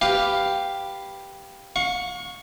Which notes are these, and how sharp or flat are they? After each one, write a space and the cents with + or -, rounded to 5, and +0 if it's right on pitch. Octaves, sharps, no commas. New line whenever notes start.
G4 +0 B4 +0 F5 +0
F5 +45 C#6 +0